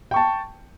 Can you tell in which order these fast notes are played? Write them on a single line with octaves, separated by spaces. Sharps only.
G5 C#6 A5